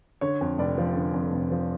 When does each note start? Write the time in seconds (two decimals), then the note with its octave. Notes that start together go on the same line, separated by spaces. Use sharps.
0.21 D3 C#5
0.41 F2
0.58 F1 D5
0.78 F3
0.96 D3
1.14 F2
1.32 F1
1.51 F3